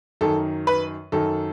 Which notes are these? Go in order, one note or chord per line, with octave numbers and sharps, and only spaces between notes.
F#2 D#3 A4
B4
F#2 D#3 A4